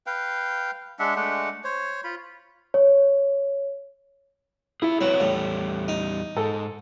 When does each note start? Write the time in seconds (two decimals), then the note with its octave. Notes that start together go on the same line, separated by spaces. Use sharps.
0.06 B4 F5 G5
0.99 G#3 D4 E5 F#5
1.16 G#3 A3 D4 F#5
1.64 C5 C#5
2.04 F4 B5
2.74 C#5
4.82 E4 G#4 E5
5.01 F#3 C4 F#4 B4
5.20 E2 A2 G3
5.88 D#4
6.37 G#2 A4